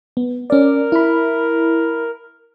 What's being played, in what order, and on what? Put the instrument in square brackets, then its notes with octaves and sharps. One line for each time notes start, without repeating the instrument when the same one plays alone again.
[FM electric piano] B3
[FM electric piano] C#4 D5 [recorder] A#4
[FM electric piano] E4 B5